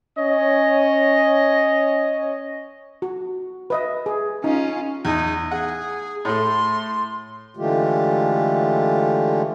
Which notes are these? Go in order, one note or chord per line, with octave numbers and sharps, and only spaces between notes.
C#4 C#5 D#5
F#4
B4 D#5 E5
G#4
C#4 D#4 F4
E2 D#4
G#4 F#5
A2 A3 C6
D3 E3 G#3 A3 F4 G4